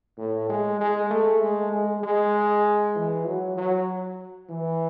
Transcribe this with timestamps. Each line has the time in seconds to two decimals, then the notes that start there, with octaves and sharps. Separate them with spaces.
0.18 A2
0.49 G#3
0.80 G#3
1.10 A3
1.41 G#3
1.72 G#3
2.03 G#3
2.95 E3
3.26 F#3
3.57 F#3
4.49 E3